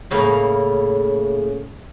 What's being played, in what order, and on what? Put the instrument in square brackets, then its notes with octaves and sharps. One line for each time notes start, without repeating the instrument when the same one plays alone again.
[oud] A2 C#3 A#3